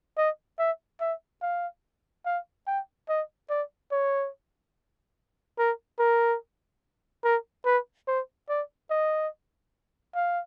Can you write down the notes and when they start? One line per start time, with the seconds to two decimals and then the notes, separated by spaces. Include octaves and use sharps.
0.17 D#5
0.59 E5
1.00 E5
1.42 F5
2.25 F5
2.67 G5
3.09 D#5
3.50 D5
3.92 C#5
5.58 A#4
5.99 A#4
7.24 A#4
7.65 B4
8.08 C5
8.49 D5
8.91 D#5
10.15 F5